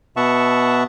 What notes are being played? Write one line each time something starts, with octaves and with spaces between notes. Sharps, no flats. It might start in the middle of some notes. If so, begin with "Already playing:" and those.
B2 B3 E5 F#5 A5 C#6